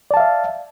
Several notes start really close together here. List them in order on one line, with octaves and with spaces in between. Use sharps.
D5 A5 F5 E5